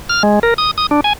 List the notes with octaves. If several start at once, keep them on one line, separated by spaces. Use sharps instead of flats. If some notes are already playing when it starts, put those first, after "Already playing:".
F6
G#3
A#4
D#6
D#6
D4
G#5